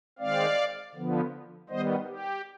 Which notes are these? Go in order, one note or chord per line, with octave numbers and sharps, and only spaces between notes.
D#3 G#3 C4 D5 F5
D3 F3 B3
D#3 G3 B3 C5 D#5
G4